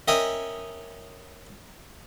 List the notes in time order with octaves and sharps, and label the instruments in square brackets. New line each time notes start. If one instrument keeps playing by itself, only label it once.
[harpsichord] C#4 A#4 D#5 E5 G5 G#5